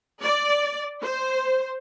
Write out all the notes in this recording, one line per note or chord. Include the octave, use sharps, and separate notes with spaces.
D5
C5